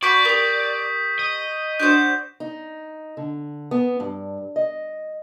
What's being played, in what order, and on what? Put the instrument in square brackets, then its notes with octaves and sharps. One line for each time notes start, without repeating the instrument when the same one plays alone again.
[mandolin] F#4 B5 D6 [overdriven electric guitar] D5 [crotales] C#6 G6 B6
[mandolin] G4 A#4 [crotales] C#6 D#6 B6
[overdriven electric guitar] D#5
[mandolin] D4 F#4 C5 [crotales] G6
[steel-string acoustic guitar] D#4
D3
B3
G2
D#5